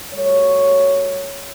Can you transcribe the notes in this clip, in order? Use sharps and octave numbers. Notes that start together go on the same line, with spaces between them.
G3 A3 F#4 C#5